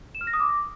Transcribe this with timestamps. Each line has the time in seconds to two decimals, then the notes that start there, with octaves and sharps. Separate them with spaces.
0.15 E7
0.21 F6
0.27 A#6
0.33 D#6
0.40 D6